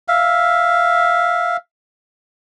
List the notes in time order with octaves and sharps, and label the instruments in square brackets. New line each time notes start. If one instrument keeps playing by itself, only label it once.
[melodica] E5 F5